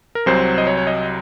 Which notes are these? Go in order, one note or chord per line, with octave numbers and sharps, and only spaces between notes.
A#4
C2 C3 F#3 C5
D#5
C#5
C#5
D#5